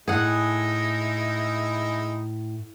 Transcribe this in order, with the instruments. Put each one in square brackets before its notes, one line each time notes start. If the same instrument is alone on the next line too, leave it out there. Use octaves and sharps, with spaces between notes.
[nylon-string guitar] A2 [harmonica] G#3 D#4 E4 [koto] G#4 F#5